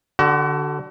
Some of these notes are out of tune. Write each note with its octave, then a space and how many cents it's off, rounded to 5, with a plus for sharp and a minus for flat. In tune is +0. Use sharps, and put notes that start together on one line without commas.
D3 +0 F#4 +35